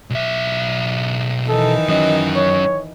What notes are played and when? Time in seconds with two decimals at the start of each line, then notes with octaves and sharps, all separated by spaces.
0.10 B1 E5
1.48 D#3 E3 D#4 A4
1.89 F#3 C#4 D#5
2.35 C#5